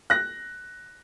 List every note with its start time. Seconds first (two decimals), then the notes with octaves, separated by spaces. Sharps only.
0.10 F#6 A#6